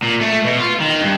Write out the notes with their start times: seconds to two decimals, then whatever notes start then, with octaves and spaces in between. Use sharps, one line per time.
0.03 A#2
0.21 A3
0.44 B2
0.59 F4
0.80 D#3
1.01 G2